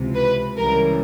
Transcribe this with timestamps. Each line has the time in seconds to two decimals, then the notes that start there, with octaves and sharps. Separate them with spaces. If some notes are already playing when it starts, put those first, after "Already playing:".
Already playing: C#2 C3 E3
0.15 B4
0.56 C#2 C#3 E3 G3 A#4